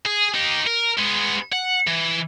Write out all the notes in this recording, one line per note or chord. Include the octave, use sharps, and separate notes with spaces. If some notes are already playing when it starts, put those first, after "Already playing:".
G#4
D#4 G4
A#4
G#3 B3
F#5
E3